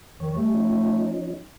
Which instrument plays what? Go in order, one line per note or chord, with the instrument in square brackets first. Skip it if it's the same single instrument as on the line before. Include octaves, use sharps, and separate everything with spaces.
[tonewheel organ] F2 C#5 [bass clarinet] D#3
[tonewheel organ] G3 [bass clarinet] A3
[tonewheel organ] F3 C#4 D#4